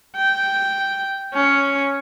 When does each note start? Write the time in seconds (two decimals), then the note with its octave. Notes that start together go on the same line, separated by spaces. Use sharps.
0.16 G5
1.34 C#4